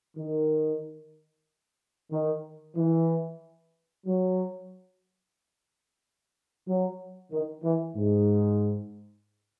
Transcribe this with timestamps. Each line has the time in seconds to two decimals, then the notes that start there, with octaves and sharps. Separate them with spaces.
0.17 D#3
2.11 D#3
2.76 E3
4.07 F#3
6.67 F#3
7.32 D#3
7.64 E3
7.96 G#2